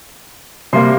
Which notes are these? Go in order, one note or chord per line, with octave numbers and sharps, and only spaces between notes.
C3 G3 A#3 C6